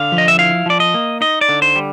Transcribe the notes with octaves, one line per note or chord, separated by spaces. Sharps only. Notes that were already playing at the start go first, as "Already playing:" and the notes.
Already playing: D3 F5
F3
D#5
E5
E4 F5
F3 D5
D#5
A#3
D#4 D#5
D5
D3
C5
G3